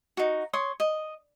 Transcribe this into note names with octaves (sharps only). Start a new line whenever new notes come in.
D#4 F#4
C#5 C6 D#6
D#5